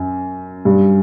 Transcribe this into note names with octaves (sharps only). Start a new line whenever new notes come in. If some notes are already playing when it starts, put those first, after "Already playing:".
Already playing: F#2
G2